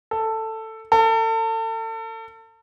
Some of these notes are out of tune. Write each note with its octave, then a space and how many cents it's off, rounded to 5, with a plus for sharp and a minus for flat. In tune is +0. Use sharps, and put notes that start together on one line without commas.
A4 +10
A4 +35